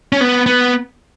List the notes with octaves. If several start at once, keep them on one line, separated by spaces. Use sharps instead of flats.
C#4
B3
B3